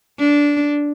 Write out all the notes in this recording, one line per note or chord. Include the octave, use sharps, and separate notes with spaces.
D4